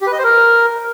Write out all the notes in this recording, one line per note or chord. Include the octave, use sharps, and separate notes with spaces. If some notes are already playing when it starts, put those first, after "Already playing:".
G4
B4
D#5
C5
A#4